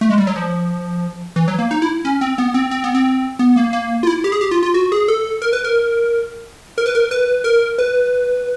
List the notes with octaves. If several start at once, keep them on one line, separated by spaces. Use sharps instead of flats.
A3
G#3
G3
F#3
F3
E3
F#3
A#3
D#4
E4
C#4
C4
B3
C4
C4
B3
C4
B3
A#3
A#3
F4
E4
G4
G#4
G4
F4
F4
F#4
G#4
A4
A#4
B4
A#4
A#4
B4
A#4
B4
A#4
B4